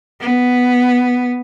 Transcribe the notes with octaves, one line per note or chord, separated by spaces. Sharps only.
B3